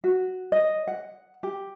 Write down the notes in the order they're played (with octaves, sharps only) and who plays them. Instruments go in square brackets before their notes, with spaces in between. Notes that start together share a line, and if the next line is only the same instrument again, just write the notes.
[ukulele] F#4
D#5
F#5
G4